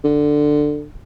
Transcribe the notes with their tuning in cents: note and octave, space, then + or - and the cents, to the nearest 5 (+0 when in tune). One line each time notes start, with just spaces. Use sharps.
D3 +10